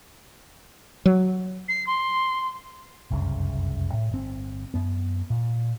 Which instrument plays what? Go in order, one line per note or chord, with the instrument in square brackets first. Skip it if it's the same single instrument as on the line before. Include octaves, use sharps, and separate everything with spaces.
[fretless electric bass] F#3
[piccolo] C7
C6
[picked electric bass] F1 C2 F#2 C#3
A2
G1 C4
F#2 B3
A#2